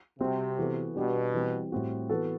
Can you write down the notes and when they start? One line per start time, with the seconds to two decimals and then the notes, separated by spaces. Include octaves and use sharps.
0.19 C3 G3 C4 F#4
0.58 E3 B3 F#4 A4
0.95 B2 G3 D4 G4
1.33 E3 G3 C4
1.72 A2 G3 C4 F#4
2.09 E3 B3 F#4 A4